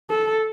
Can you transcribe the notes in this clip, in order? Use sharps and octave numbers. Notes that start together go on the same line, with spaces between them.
A4